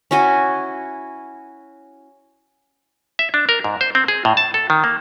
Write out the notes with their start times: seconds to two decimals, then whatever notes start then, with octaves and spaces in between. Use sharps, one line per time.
0.11 C#4 E4 F#4 G#5
3.19 E5
3.34 D4
3.49 A#4
3.64 G#2
3.81 C5
3.95 C4
4.08 G#4
4.25 A2
4.37 A5
4.54 A4
4.70 D#3
4.84 A#3